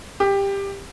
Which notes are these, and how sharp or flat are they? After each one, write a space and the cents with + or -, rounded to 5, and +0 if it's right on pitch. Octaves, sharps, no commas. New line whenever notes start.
G4 +15